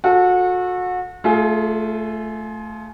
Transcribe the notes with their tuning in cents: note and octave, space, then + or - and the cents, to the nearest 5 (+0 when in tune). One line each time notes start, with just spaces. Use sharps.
F#4 -30 A4 +0
A3 +0 F4 +0 G#4 +35